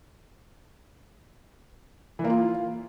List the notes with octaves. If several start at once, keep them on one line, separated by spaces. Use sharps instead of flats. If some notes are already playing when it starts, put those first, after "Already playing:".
E3
A#3
F4